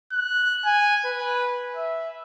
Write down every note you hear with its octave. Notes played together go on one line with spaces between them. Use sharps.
F#6
G#5
B4
E5